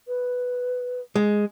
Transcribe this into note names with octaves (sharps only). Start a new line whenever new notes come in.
B4
G#3